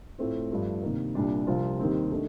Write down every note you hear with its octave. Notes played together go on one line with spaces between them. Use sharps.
A2 A3 C4 F4
G2 F3 A3 D4
C3 D#3 A#3
C2 A#2 G3 D4
C2 C3 F3 C4 F4
D#2 D#3 G3 C4
D#3 A3 D4